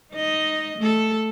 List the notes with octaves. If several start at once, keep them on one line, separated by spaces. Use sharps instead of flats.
D#4 D#5
A3 A4